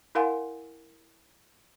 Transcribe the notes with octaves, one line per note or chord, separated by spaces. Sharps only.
E4 A#4 F5 F#5 G#5 C6